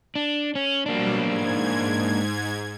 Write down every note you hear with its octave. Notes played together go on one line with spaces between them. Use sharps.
D4
C#4
B2 F#3 G3 A#3 D4
G#2 G#6